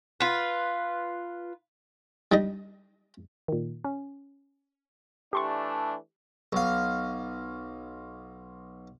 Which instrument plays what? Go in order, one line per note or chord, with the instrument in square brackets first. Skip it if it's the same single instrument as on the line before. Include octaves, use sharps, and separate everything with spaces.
[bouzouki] F4 B4
[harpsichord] G3 D4 D#4 D#5
[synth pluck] A#2 D#3
C#4
[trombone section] E3 A3 D4 [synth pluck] G4 C6 C#6
[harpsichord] B1 F5